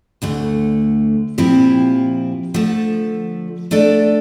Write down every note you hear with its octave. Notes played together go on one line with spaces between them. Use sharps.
D2 D3 A3
A#2 F3 C4 E4 G4
D3 F3 A3
D3 A3 D4 A4 D5